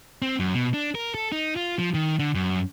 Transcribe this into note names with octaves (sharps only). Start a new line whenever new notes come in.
C4
F#2
B2
D4
A#4
A4
D#4
F4
F3
D#3
D3
F#2